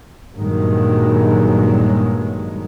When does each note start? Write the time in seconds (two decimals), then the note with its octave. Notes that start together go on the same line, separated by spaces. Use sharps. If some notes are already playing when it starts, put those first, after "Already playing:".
0.35 G2 A#2 D#3 F#3 G#3